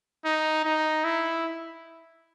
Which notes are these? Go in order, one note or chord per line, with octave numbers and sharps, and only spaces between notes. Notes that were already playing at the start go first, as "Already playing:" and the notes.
D#4
D#4
E4